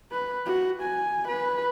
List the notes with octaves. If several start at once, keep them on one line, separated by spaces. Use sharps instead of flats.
B4
F#4
G#5
B4